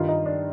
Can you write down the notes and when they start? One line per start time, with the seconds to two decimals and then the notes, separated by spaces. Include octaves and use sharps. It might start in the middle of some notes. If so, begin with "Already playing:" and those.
Already playing: G2 D#3 G3 F4
0.08 D#4
0.26 D4